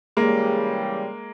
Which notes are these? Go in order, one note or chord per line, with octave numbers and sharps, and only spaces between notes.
C#3 E3 G3 G#3 A#3